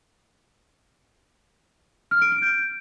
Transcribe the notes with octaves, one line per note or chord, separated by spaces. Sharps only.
F6
D7
D7
G6